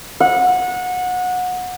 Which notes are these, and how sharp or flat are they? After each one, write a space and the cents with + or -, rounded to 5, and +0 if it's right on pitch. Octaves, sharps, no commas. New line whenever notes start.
F#5 -25